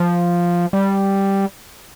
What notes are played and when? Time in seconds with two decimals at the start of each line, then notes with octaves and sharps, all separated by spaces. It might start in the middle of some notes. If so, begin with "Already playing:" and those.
Already playing: F3
0.73 G3